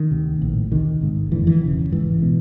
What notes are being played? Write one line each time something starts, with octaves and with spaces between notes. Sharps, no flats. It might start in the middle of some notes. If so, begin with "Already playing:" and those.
Already playing: D#3
D2 C3
A#1 A2
D2 C3 D#3
G#1 G#2
F#1 F2 D3 E3
E3
E1 D2 C#3
G#1 G#2 E3
B2